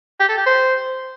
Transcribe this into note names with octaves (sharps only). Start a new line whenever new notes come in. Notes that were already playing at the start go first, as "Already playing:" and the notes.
G4
A4
G4
C5